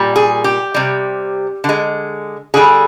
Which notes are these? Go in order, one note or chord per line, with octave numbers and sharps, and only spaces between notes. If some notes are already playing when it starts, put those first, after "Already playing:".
Already playing: A#2 G3
G#4
G4
C3 G3
D3 G#3
D3 G3 G#4